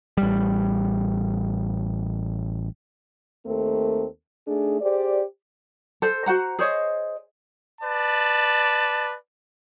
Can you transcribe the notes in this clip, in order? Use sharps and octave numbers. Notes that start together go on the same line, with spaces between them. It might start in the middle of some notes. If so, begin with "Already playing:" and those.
A1 G3
D#2 A3 C4 A4 A#4
A3 D4 D#4 G#4
G4 G#4 C5 D5
A4 C5
F#4 C5 F#5 A#5
G#4 C5 C#5 D#5
B4 D5 A5